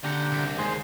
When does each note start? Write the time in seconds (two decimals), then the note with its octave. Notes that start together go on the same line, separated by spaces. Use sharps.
0.04 D3 A#3 G4 F#5
0.32 C2
0.58 D#2 G#3 C5